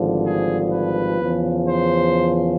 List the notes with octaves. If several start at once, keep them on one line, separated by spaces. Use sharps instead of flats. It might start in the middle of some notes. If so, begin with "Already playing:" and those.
Already playing: G#1 G2 D3 F3
G#4
B4
E2 C#3 F3
C5